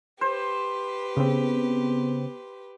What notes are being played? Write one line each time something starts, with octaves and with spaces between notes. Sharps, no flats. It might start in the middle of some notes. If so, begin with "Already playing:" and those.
G4 B4 C5
C#3 B3 C4